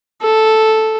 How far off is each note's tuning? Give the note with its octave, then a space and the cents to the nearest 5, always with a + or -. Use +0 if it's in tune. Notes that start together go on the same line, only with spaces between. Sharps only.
A4 -5